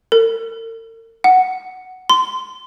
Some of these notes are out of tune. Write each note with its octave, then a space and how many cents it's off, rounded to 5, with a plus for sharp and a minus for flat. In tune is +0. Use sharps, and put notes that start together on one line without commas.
A#4 -45
F#5 +5
C6 -25